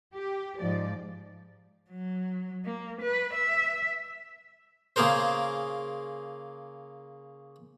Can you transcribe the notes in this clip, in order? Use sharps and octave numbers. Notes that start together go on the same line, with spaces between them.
G4
G#2 F3 D5
F#3
A#3
B4
E5
C#3 A#3 G#4 A#4 C5